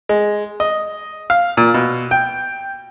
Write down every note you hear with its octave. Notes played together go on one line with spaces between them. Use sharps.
G#3
D#5
F5
A#2
B2
G5